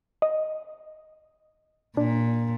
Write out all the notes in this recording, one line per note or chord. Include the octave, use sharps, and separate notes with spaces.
D#5
A#2 D4